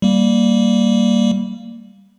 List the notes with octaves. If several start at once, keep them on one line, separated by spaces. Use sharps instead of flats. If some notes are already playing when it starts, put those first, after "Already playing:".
G3 A#3